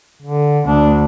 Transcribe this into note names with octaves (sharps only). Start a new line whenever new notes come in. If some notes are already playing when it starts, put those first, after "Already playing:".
D3
D2 D4